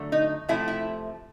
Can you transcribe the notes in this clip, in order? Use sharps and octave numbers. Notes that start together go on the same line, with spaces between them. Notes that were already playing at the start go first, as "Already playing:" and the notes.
Already playing: D3 F#3 A3
D#4
C3 F3 A3 E4
E4